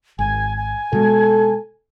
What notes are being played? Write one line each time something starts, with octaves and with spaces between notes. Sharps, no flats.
G#1 G#5
G#5
B2 G#3 A4